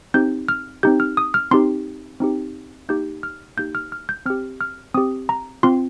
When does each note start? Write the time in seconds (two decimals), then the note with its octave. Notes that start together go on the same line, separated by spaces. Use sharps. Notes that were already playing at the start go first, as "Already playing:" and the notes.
0.14 C4 D#4 G4 G6
0.48 F6
0.83 C4 D#4 G4 G6
1.00 F6
1.17 D#6
1.34 F6
1.51 C4 D#4 G4 C6
2.20 C4 D#4 G4
2.89 A#3 D#4 G4 G6
3.23 F6
3.57 A#3 D#4 G4 G6
3.75 F6
3.92 F6
4.09 G6
4.26 C4 G4 F6
4.61 F6
4.94 C4 G4 D#6
5.29 A#5
5.63 C4 F4 C6